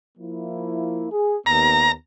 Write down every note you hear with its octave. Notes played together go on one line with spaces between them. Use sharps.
F3 A#3 E4
G#4
D#2 B3 A#5